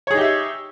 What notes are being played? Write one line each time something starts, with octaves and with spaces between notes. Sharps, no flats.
D#4 G4 G#4 C#5 E5